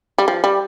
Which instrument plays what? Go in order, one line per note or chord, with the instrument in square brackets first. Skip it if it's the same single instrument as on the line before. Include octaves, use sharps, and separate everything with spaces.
[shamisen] G3
F3
G3